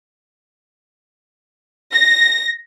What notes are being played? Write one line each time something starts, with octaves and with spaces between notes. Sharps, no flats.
A#6